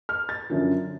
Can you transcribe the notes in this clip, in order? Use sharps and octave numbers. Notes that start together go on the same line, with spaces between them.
F6
A6
F#2 D3 F3